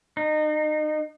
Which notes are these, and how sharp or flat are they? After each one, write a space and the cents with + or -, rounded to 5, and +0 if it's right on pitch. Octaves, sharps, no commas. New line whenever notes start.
D#4 -30